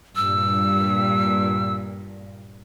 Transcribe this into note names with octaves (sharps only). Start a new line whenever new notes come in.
G2 A#2 E6